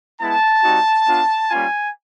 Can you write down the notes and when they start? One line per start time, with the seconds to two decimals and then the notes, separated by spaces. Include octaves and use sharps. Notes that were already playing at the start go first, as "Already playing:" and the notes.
0.21 G#3 B3 E4 A5
0.64 G3 C4 D#4 F#4
1.06 B3 D4 F4
1.50 G3 A#3 C#4 F4 G#5